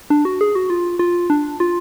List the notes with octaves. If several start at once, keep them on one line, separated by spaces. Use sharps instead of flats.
D4
F#4
G#4
F#4
F4
F4
D4
F4